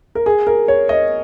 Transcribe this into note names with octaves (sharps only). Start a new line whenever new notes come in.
A#4
G#4
A#4
C#5
D#5